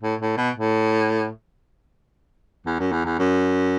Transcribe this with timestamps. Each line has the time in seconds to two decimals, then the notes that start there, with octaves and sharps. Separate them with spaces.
0.03 A2
0.21 A2
0.37 B2
0.56 A2
2.66 E2
2.80 F#2
2.92 E2
3.06 E2
3.19 F#2